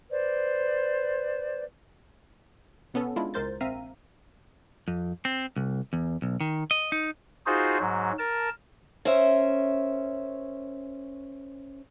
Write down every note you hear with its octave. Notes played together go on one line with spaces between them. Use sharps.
B4 C5 D5
B2 B3 C#4 A4
G#3 D4 E4 F4
C#2 G#3 A#4 C5 G6 A6
A#1 C4 E5 F5 A#5 D#7
F2
C4
C2
E2
B1
D#3
D#5
D#4
D#4 F4 F#4 G#4 C5
G#2 F#3
A#4 A5
C#4 A#4 C5 E5